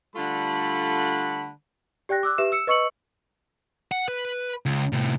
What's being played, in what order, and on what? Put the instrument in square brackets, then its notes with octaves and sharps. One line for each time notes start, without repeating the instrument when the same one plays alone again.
[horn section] D3 G3 A3 F4 F#5 B5
[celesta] G4 D5 G5 F#6 A#6
D6 E6 F#6
G4 B4 E5 E7
E6 C#7 E7
B4 D#5 C#6 E6 C#7 F#7
[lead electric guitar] F#5
B4
C#2
A2 C3